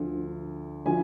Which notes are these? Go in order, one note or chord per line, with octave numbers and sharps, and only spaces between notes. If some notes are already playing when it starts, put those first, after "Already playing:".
Already playing: D2 D3 F3
D3 F3 G#5